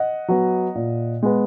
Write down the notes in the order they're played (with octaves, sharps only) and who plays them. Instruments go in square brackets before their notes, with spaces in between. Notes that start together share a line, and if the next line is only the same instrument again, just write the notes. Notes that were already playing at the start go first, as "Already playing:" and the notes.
Already playing: [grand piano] D#5 F#5
F#3 B3
A#2
G#3 B3